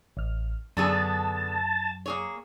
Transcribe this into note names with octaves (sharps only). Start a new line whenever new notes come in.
A1 F6
F#2 D3 B3 G#4 A5
A#3 G#4 C#5